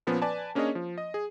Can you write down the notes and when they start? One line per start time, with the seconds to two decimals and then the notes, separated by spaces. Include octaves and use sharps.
0.07 A#2 F3 B3 C#4
0.22 B4 D5 G#5 A5
0.55 A#3 C#4 D4 G#4 C#5 D#5
0.75 F3
0.98 D#5
1.14 G#4